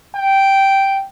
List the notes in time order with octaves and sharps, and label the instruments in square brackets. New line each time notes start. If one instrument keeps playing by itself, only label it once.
[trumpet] G5